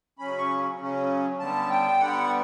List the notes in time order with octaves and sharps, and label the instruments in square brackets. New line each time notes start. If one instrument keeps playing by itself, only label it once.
[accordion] C#3 F#3 C#4 B5
C#6
C#3 F#3 C#4
D3 G3 B3 A5
G5
D3 G3 B3 F#5